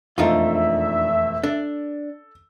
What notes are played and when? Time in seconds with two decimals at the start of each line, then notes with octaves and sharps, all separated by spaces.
0.18 E1 F2 A3 D4 D#4 F4 E5
1.44 D4 A4